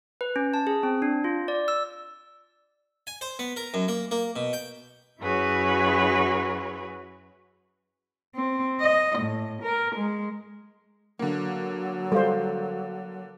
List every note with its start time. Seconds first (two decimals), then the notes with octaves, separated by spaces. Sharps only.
0.21 B4
0.36 C#4
0.54 A5
0.67 G#4
0.83 C4
1.02 D4
1.24 F4
1.48 D5
1.68 E6
3.07 G#5
3.21 C5
3.39 B3
3.56 A#4
3.74 F#2
3.88 A#3
4.11 A#3
4.36 B2
4.53 G5
5.20 F#2 E4 F#4 G#4 B4 C#5
8.35 C4
8.80 D#5
9.19 A2
9.63 A#4
9.96 G#3
11.19 D3 F#3 A#3
12.12 G3 A4 C5 F5